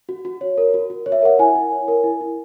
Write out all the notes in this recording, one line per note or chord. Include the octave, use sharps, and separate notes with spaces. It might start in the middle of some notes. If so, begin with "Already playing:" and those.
F#4
F#4
C#5
A#4
F#4
F#4
C#5
E5
A#4 F#5
E4 G#5
E4
C#5
A#4
E4
E4